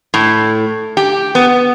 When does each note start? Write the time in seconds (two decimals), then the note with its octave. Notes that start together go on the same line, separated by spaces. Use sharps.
0.14 A2
0.97 G4
1.35 B3